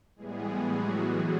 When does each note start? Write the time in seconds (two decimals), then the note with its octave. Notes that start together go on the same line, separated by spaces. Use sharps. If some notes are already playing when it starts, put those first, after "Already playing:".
0.16 A2 E3 G3 G#3 B3 G#4
0.63 F#3 F#4